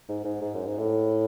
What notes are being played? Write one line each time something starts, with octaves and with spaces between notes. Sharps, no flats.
G#2
G#2
G#2
F#2
G#2
A2